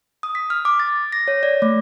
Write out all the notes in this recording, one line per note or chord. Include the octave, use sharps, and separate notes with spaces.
D#6
B6
F6
D6
A6
A#6
C#5
D5
A3